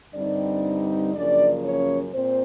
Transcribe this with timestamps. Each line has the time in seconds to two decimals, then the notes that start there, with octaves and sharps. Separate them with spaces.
0.14 G2 D3 G3 C4 D4 D#4 D5
1.15 F#2 C#3 F3 A#3 D4 D5
1.64 C#4 C#5
2.14 A#2 C4 C5